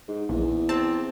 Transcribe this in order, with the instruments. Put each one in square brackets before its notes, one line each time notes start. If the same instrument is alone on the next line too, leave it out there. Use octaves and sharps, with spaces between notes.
[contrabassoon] G#2
[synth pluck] A#1 [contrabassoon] E2
[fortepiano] C4 [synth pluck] A5